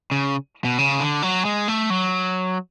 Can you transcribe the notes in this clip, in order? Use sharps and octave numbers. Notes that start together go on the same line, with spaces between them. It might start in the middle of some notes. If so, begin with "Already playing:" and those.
C#3
B2
C#3
D3
F#3
G#3
A3
F#3